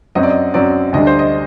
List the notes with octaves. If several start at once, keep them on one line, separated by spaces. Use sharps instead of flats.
F#2 F#3 C4 D#5
D5
D#5
F#2 F#3 C4 D5
D2 D3 G3 D4 D#5
C5
D#5